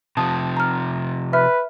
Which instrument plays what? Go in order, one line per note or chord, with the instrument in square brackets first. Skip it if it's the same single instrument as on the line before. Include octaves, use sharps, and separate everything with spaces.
[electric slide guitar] C3 F3 [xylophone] A5 D#6
[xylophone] A#5 F6
[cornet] B4 [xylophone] E5 F6